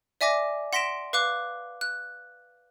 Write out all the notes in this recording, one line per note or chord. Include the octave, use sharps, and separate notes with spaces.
D5 E5 G#5 D6 A#6
F#5 C6 A#6 B6 D7 E7
B4 F5 D6 F#6
F#6